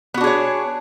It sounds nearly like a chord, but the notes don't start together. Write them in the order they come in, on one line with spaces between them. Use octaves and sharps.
B3 F#4 D4 G#4 C#5